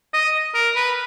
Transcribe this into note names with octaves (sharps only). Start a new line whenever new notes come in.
D#5
A#4
B4